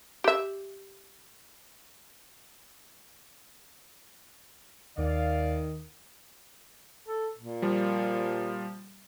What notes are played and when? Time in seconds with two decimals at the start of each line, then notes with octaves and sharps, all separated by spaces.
0.24 G4 E5
4.98 D#2 D#3 D5 F5
7.06 A4
7.38 A#2
7.62 F3 G3